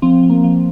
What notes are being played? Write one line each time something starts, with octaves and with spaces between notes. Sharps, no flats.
F3 C4
F3
A#3
F3